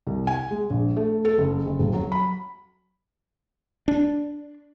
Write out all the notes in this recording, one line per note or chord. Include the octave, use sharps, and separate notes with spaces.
C2
G#5
G#3
A#1
A3
A4
F#1
F#1
D#1
F#3
B5
D4